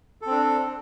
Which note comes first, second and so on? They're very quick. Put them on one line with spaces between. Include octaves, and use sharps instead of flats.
A4 C4 D4